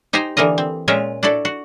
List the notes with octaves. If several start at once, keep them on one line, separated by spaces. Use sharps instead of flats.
D#4 G4 C5 G#5 A#5
D3 E3 A#3 A#4 D#5
C4
A#2 G#3 C#4 F4 A#4 E5
D4 E4 F#4 A4 D5
F#4